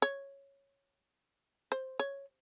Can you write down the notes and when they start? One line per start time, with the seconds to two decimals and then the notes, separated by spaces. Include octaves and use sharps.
0.02 C#5
1.72 C5
2.00 C#5